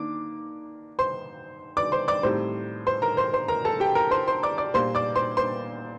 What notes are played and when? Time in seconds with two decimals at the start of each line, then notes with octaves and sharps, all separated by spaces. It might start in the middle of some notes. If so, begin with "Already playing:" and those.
Already playing: D#3 A#3 D4 D6
0.99 C5 C6
1.77 D5 D6
1.92 C5 C6
2.08 D5 D6
2.23 A2 G3 C4 D#4 C5 C6
2.87 C5 C6
3.02 A#4 A#5
3.17 C5 C6
3.33 C5 C6
3.48 A#4 A#5
3.65 A4 A5
3.80 G4 G5
3.95 A#4 A#5
4.11 C5 C6
4.28 C5 C6
4.43 D5 D6
4.58 D5 D6
4.74 A#2 G3 A#3 C5 C6
4.95 D5 D6
5.16 C5 C6
5.37 C5 C6